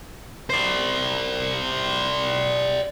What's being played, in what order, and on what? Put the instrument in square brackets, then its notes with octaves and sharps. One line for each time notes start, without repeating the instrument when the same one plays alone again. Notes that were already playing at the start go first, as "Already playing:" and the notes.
[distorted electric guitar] C5 D5